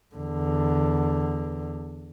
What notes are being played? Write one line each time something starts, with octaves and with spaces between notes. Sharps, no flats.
E2 D3